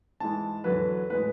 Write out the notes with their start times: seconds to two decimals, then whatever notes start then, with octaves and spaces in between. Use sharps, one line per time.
0.20 G#2 E3 G#3 A5
0.64 E2 D3 F#3 B4
1.10 A2 G#3 B4